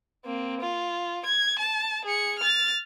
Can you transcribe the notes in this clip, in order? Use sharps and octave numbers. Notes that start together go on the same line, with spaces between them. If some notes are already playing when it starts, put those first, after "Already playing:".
A#3 C4
F4
G#6
A5
G#4 C#7
F6 A6